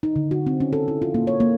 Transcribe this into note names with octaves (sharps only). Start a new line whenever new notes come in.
D#4
D3
F#4
C4
C#4
A4
E4
F4
A#3
C#5
A#3